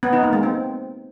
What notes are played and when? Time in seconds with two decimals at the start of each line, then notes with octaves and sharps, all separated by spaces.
0.03 B3
0.13 D#4
0.23 A#3
0.33 G#3
0.43 C4